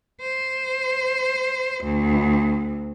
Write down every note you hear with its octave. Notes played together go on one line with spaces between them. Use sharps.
C5
D2